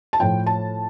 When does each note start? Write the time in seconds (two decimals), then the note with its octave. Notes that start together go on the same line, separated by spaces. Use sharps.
0.13 A5
0.19 A2 F3 G5
0.47 A5